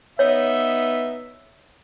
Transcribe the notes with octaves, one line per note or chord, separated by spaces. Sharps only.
B3 D#4 C#5 E5